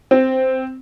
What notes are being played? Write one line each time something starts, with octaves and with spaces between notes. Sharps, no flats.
C4